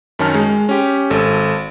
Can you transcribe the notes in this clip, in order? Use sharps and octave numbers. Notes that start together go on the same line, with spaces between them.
F#2 D#3 C#4 A5 F6
G#3
C#4 G4
G#1 A4